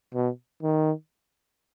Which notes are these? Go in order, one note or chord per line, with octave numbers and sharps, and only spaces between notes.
B2
D#3